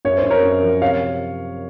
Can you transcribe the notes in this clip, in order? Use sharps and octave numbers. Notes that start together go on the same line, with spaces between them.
F#2 C#5
C5
F#2
A#4 C#5
F#2
F3
C3 C#5 F5